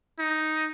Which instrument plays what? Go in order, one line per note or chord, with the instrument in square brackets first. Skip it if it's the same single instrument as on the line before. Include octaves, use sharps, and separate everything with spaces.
[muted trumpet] D#4